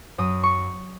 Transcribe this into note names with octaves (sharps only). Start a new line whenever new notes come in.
F#2 D#6
C#6